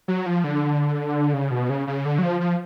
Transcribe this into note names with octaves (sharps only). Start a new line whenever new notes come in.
F#3
F3
D3
C#3
B2
C#3
C#3
D3
F#3
F3
F3